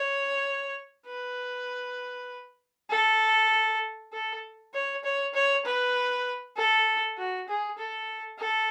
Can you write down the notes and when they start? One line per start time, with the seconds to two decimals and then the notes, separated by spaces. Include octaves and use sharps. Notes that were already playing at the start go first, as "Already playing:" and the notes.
Already playing: C#5
1.07 B4
2.91 A4
4.13 A4
4.74 C#5
5.04 C#5
5.34 C#5
5.66 B4
6.57 A4
7.18 F#4
7.48 G#4
7.78 A4
8.39 A4